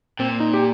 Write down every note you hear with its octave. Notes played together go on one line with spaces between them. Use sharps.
A#2 C4
D#4
G4